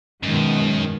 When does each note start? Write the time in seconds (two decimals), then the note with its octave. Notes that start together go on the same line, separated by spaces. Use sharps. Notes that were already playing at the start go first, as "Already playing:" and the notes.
0.23 F#2 B2 D#3 G#3